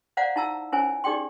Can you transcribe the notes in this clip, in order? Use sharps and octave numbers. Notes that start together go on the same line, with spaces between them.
C5 D5 F5 F#5 A#5
D#4 E4 A5 A#5 E6
C#4 E4 A#4 C5 C#5 G#5
D#4 G4 G#4 D5 G5 C6